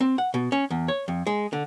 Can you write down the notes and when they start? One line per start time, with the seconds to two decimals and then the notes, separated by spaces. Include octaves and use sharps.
0.01 C4
0.18 F#5
0.34 B2
0.52 C#4
0.71 E2
0.88 C#5
1.08 F2
1.27 G#3
1.53 D3